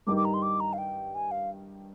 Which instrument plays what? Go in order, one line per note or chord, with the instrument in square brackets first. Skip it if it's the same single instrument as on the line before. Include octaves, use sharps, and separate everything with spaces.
[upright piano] G2 D#3 G3 [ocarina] D6
[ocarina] D6
A#5
C6
D6
A#5
F5
G5
G#5
F5